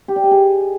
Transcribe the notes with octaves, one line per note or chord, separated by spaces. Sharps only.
G4
D5
D#5
G#4